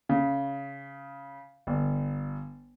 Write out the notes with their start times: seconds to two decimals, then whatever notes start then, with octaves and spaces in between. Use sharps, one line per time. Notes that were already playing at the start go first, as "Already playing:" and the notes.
0.09 C#3
1.67 G1